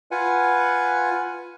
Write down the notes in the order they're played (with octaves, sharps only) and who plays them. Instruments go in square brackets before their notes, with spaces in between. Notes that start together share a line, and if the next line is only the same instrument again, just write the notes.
[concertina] F4 B4 F#5 G#5